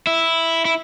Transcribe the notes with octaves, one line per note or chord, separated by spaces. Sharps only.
E4
E4